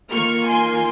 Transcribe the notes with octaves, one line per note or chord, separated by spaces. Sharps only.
D#3 A#3 F4 C#6 F6
G#5 C6